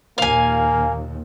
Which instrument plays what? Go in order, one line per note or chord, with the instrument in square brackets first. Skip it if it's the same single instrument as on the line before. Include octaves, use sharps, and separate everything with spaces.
[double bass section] D#2 A#2 [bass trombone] A#3 [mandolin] F5 G#5